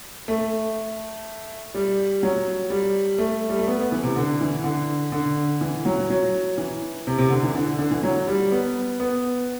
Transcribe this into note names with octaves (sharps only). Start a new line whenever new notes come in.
A3
G3
F#3
G3
A3
G3
A3
B3
B3
E3
C3
D3
E3
D3
D3
E3
F#3
F#3
E3
C3
C3
D3
E3
D3
D3
E3
F#3
G3
B3
B3